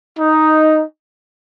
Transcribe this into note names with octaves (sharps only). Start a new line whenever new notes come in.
D#4